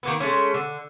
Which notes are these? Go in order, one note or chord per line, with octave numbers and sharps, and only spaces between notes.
D#3 A#3 B3
G#3 A3 C#4
D3